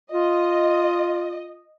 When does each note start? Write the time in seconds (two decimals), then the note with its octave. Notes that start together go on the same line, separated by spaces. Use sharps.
0.12 F4 D#5